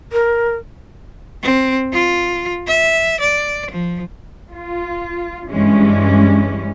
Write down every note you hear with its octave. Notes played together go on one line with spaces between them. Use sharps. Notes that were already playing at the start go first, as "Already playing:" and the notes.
A#4
C4
F4
E5
D5
F3
F4
G2 E3 G#3 C#4